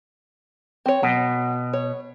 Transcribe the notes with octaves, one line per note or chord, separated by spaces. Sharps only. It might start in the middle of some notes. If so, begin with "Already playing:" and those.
C4 C#5
B2 F#3
C#5